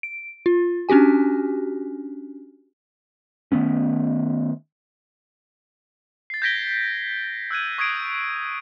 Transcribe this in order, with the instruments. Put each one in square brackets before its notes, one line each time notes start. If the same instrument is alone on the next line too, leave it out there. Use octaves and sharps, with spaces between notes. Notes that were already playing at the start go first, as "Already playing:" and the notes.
[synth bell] D7
F4
C#4 D4 F#4 G4 G#5
[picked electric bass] D#3 A3 B3 C#4
[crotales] A6 C7
G6 G#6 A#6 B6 D7 G7
E6 F#6 G#6 D#7
C#6 D#6 G#6 C7 D7